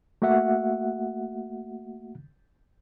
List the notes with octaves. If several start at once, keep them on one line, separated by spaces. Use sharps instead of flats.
A3 A#3 F#4 E5 F#5